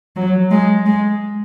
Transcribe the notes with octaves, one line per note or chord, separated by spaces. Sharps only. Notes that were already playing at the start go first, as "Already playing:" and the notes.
F#3
G#3
G#3